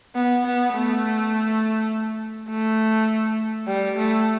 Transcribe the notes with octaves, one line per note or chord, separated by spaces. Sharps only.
B3
B3
A3
A3
G3
A3